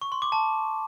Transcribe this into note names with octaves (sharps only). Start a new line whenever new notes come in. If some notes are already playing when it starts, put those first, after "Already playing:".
C#6
C6
D6
A5